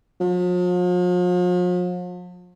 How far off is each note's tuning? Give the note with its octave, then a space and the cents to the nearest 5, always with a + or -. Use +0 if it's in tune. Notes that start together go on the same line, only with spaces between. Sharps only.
F3 +45